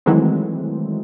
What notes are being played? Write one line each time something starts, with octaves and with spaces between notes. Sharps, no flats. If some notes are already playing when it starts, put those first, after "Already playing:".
D#3 E3 F#3 G#3 A3 C4